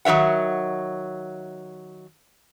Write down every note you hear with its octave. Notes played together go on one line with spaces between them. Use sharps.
D#3 F#3 C#5 E5 F#5